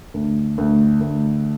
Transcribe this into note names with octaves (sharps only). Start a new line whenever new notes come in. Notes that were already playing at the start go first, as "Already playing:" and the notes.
D2
D2
D2